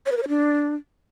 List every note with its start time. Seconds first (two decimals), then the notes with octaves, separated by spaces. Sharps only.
0.06 C#5
0.12 B4
0.17 A#4
0.23 C#5
0.28 D4